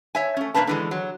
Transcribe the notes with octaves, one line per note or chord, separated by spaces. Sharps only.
C#5 E5 G#5
A3 C#4
A#2 D3 A#3 D4 B4 A5
D3 E3 G#3
F#3